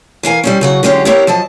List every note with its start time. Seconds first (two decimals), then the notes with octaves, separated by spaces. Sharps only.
0.23 E3 A#4 F5 G#5
0.44 G3 C4 C#4
0.61 C#3 F#3 F#4
0.83 D3 F#3 G#3 C#4 F#4 G4
1.05 B3 C4 E4 G4 A#4 C#5
1.27 F3 F#3 D#5 A5